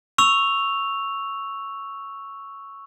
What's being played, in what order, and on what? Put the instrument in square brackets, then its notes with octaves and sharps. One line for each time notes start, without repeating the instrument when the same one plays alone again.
[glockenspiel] C#6 E6 F7